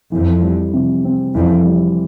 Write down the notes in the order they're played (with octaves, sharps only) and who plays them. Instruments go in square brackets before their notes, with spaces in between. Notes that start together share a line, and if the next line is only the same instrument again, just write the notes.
[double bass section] F2 [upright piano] E3
[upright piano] G3
C3
C4
[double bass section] F2 [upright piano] E3
[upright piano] G3